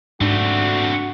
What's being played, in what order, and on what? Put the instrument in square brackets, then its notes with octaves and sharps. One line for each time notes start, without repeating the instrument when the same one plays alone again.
[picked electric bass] G#2 [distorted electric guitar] A3 C4 [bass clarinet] D4 [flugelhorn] F#4